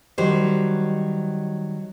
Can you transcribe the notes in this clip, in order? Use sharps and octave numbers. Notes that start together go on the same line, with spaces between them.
D#3 F#3 G3 C5